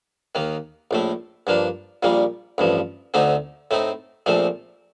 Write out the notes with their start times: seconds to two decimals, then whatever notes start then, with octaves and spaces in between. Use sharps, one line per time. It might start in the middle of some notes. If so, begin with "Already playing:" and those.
0.35 D#2 D#3 A#3
0.91 A#1 A2 A3
1.47 G2 F3 A#3 D4
2.03 A#1 A#2 G3 A#3
2.58 A1 G2 F3
3.14 D2 D3 A3 C4 D#4
3.71 A2 A3 C4 D#4
4.26 A#1 A#2 F3 A3 C4